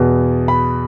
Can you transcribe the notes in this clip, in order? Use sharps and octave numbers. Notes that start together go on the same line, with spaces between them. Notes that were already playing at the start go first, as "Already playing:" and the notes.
Already playing: E2 B2
B5